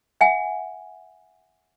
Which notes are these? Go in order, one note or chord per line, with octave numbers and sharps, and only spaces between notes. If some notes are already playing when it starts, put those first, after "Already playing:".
E5 F#5 G#5